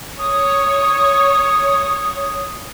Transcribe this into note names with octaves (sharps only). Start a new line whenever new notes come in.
C#5 D#6